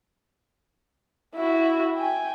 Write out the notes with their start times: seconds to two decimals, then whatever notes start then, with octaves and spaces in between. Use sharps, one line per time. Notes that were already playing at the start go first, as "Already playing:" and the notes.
1.35 E4 F#4
1.96 G5 G#5